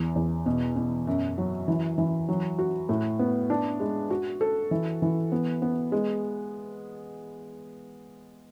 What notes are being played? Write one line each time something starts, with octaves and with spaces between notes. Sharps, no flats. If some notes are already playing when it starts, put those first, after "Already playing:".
Already playing: E2
E2
B2
B2
F#2
F#3
E3
E3
F#3
F#4
A2
B3
D4
G#3
F#4
A4
E3
E3
B3
B3
G#3